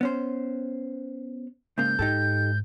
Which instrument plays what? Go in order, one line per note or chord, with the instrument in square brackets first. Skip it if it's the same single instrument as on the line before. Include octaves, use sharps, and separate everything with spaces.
[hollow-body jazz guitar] B3 C#4 C5
[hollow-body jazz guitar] G#2 C#3 A#3 [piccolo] G6
[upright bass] G#2 [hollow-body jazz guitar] D#4 G4 A4